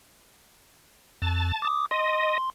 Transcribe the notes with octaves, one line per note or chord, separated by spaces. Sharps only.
F2 A5
D6 D#6
D#5 C6